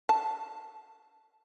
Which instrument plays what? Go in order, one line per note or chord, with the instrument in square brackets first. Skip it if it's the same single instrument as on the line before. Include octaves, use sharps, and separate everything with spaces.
[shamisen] A5